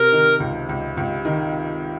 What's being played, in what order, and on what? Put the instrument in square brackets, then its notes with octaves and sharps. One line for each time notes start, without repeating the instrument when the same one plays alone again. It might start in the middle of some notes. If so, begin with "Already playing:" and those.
Already playing: [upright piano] C3 [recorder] A#4
[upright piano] D#3
C#2
C#2
C#2
D#3